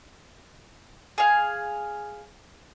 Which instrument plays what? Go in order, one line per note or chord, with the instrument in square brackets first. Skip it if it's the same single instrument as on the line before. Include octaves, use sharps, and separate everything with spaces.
[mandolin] G#4 F5